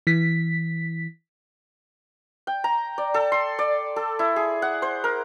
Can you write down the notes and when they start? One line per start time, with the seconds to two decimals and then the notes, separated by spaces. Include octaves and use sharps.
0.07 E3 B6
2.47 G5
2.64 A#5
2.98 D5
3.14 A4
3.32 C6
3.59 D5
3.96 A4
4.19 E4
4.36 G#4
4.62 F#5
4.82 C5
5.04 A#4